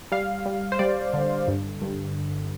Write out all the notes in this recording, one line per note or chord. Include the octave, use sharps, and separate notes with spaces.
G3 F5
G3
C5
G3 D5
D3
G2
G2